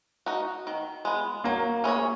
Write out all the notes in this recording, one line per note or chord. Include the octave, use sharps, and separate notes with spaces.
D#4 F#4
D#3
G#3 B3
F#3 A#3
C#4 E4 G#4 C#5